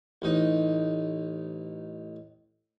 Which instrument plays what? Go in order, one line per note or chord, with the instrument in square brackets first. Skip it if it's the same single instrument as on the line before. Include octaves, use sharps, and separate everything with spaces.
[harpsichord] A1 D#4